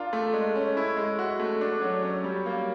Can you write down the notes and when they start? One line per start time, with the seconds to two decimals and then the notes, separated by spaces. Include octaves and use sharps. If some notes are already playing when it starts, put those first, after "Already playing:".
Already playing: D4 F4 A#4
0.13 A3
0.34 G#3
0.55 C#4
0.77 E4
0.97 G#3
1.19 F#4
1.40 A3
1.61 D4
1.81 F#3
2.03 C#4
2.24 G3
2.46 A#3